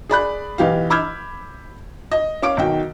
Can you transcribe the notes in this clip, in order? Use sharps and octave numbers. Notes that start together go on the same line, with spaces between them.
G#4 D5 B5 F#6
B1 E3 G4 F5
B5 D6 E6 F6 G6 G#6
D#5
C#4 F5 D6 D7
B1 D#3 F#4 G5